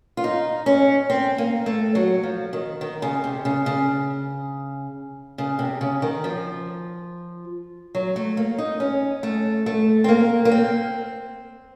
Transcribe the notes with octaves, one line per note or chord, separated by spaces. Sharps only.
F4
D#4
C#4
C4
A#3
A3
F#3
F3
D#3
D#3
C#3
C3
C#3
C#3
C#3
C3
C#3
D#3
F3
F#3
A3
A#3
D#4
C#4
A3
A3
C4
A#3
A#3
C4